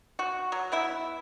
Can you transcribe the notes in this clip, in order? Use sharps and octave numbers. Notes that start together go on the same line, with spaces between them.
F#4
F#3
B3 E4 E5